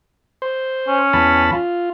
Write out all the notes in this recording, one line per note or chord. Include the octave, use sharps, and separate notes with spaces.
C5
C#4
E2 A5 B5
F4